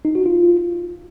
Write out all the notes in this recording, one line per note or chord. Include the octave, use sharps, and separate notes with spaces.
D#4
F#4
F4